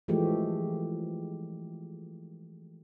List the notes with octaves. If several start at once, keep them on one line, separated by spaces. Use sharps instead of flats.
E3 F3 G#3 A3 G4